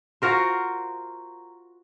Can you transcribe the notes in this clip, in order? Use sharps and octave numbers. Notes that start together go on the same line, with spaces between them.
F4 F#4 A#4 C5